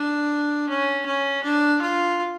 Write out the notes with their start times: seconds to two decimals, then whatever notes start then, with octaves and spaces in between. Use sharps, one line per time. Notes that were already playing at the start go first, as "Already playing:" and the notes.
Already playing: D4
0.69 C#4
1.06 C#4
1.44 D4
1.82 F4